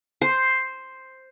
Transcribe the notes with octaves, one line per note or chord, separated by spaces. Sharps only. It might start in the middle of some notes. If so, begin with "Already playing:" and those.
C5